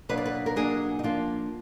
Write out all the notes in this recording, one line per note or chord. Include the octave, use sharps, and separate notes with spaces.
B2 F#3 A#3 D4 B4
D5
B4
A#4
B2 F#3 A#3 D4 G#4
D#4
F3 A#3 D4 F4